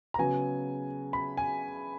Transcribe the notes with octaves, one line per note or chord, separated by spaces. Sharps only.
A#5
C#3 F#3 B3 G#5
B5
G#5